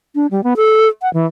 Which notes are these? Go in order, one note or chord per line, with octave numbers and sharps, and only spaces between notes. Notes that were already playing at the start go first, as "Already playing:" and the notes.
D4
G3
B3
A4
F#5
E3